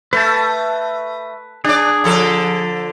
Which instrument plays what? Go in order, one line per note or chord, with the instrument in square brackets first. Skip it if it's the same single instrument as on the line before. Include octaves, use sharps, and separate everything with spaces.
[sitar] A3 [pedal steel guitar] B4 A5
[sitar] D4 D5 [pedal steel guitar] G#4
[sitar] D3 F3 A4